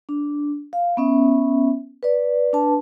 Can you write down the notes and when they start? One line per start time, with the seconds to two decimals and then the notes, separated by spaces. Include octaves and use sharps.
0.09 D4
0.73 F5
0.97 B3 C#4 E5
2.03 B4 D5
2.53 D4 B4 A5